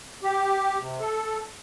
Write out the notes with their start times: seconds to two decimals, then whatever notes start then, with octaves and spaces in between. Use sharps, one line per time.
0.23 G4
0.81 C3
1.00 A4